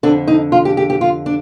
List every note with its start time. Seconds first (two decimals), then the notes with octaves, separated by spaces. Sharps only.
0.03 F2 D3 D4
0.28 D#4
0.52 F4
0.65 G4
0.77 G4
0.90 G4
1.01 F4
1.26 D4